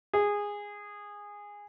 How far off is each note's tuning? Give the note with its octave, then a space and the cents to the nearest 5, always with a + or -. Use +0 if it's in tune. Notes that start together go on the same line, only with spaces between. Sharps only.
G#4 -15